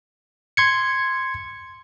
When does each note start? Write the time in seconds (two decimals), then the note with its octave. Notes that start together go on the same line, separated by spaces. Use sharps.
0.57 C6 G#6 C#7